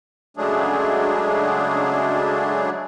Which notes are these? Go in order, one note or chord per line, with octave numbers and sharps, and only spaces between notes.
C#3 F#3 G#3 A3 D4 G#4